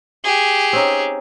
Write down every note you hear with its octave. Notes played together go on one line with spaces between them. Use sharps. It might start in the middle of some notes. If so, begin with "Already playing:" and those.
G4 G#4
C4 C#4 D#4